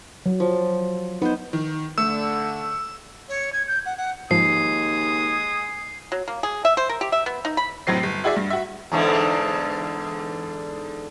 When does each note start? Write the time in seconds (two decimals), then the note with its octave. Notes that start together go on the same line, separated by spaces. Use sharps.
0.26 F#3
0.40 F3
1.22 B3 D#4 C5
1.53 D#3
1.98 D3 A3 E6
3.29 C#5
3.53 G#6
3.68 G6
3.85 F#5
3.97 F#5
4.31 D#2 G#2 F3 G#3 G#5 D#6 C7
6.12 F#3
6.28 A#3
6.43 G#4
6.65 E5
6.77 C5
6.89 A#4
7.01 G4
7.12 E5
7.26 B3
7.45 D#4
7.57 B5
7.87 F1 A2 F#3 C4 C7
8.03 G1
8.24 E4 F#4 G#4 D5 E5
8.36 G2
8.50 F#4 E5
8.92 E2 G#2 D3